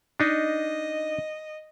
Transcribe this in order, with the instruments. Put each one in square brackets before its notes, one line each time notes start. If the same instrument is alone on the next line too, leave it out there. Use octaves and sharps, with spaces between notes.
[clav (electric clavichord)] D4 D#4 [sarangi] D#5